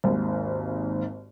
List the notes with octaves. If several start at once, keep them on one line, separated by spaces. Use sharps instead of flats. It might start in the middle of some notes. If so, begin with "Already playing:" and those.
G#1 D#2 G#2